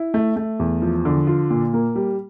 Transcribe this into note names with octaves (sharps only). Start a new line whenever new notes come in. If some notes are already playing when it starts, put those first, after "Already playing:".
Already playing: E4
A3
A3
E2
F3
D3
F4
A#2
A#3
G3